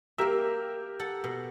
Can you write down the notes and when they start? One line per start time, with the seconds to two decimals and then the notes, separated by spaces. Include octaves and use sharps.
0.18 A#3 G4 A#4 E5 E6
1.00 A4 F#5
1.24 B2